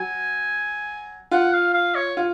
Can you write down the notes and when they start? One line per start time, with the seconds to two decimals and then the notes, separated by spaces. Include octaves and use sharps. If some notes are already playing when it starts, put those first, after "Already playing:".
Already playing: F#3 G#5
1.31 F4 F#5
1.53 F5
1.74 F5
1.95 C#5
2.17 F4